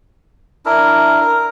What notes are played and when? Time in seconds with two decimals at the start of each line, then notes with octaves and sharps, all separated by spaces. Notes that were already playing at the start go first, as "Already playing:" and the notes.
0.66 D4 E4 A#4
1.21 A#4